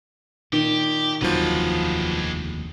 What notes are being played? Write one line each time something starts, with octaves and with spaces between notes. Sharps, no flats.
A#2 D#3 G4
F1 D#2 D3 F3 F#3 G#3 B4